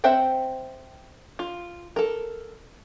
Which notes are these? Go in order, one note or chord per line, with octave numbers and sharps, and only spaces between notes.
C4 C5 E5 F#5 G5
F4
A4 A#4